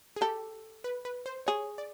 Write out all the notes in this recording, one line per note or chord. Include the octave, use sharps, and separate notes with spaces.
G#4
G4 A4
B4
B4
C5
G#4 C#5
D5